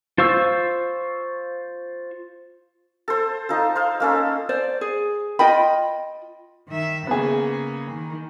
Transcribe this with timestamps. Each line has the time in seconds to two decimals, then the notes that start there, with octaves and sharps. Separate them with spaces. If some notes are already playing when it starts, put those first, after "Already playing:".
0.18 F4 C5 F5 C#6 E6
3.08 A4 C5
3.49 D#4 F4 A4
3.75 C5 F5
4.00 A#3 C#4 A4
4.49 C5 D5
4.81 G#4
5.39 F4 D#5 G5 B5
6.68 D#3 E5
7.07 C#3 A#3 B3 G#4
7.91 D#3